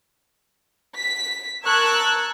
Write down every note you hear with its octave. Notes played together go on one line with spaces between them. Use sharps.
B6
A#4 A5 C#6 E6 F#6 G#6